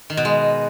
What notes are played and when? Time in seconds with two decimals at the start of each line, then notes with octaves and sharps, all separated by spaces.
0.10 D#3
0.17 B2
0.25 G#3